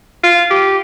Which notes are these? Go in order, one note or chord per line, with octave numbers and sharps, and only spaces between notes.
F4
G4